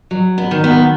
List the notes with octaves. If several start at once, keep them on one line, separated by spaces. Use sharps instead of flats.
F#3
B3
D#3
B3